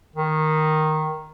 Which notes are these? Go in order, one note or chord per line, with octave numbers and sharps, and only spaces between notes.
D#3